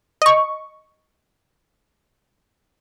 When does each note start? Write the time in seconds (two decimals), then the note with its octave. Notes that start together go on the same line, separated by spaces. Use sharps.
0.22 D#5 C#6